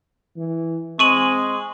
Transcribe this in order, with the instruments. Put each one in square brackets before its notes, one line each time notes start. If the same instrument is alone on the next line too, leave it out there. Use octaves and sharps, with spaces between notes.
[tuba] E3
[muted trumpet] G#3 [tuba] C4 [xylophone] C#6 D#7 F#7